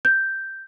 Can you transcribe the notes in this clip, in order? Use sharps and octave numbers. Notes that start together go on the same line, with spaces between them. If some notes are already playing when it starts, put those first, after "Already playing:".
G6